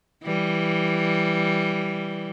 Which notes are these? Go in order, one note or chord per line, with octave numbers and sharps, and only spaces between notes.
E3 G3